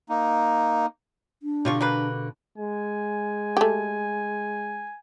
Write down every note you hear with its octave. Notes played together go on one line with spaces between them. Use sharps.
A#3 D#4
D4
B2 D3 G3 F4 C#6
G3 A#3 B4
G#3 G#5
A3 G4